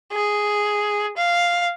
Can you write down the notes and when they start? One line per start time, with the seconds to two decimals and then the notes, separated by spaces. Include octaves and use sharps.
0.12 G#4
1.17 F5